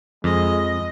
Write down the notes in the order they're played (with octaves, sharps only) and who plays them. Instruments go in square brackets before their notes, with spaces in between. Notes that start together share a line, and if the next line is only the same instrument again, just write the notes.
[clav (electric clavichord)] F2 [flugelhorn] G#3 [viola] D#5